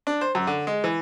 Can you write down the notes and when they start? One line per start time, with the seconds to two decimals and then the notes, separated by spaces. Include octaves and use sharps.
0.07 D4
0.21 C5
0.35 F#2
0.47 D3
0.67 G#3
0.84 E3